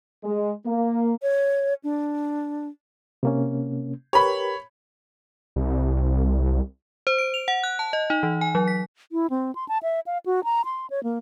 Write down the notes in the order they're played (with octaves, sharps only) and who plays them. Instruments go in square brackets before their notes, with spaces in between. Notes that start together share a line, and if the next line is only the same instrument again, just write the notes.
[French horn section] G#3
A#3
[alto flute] C#5
D4
[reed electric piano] C3 A#3 C#4
[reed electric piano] G4 A#4 B4 [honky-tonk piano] C#5 B5
[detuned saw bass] C2
[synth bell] C5
D7
F7
F#5
F#6
A5
D#5
D#4
E3
G#5
F#3
B6
[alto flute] E4
C4
C6
A5
E5
F5
F#4
A#5
C6
C#5
A#3